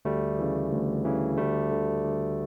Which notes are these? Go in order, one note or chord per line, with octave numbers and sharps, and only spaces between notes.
D2 G3 A3
C#3 E3
D2
C#3 E3
D2 G3 A3
D3
D2